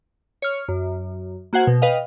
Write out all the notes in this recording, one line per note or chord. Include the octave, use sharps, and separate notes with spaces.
C#5 F6
F#2
A#3 F#4 C5 F#5 G#6
B2
B4 D#5 F5 G5